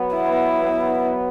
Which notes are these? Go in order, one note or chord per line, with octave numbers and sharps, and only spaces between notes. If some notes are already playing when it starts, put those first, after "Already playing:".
Already playing: F#3 B3
E4